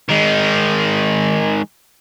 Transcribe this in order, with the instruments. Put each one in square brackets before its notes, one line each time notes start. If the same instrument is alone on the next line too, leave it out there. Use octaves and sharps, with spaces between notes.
[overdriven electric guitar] D#3 G#3